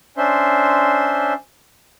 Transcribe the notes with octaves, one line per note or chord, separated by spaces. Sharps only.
C#4 D4 C5 E5 C6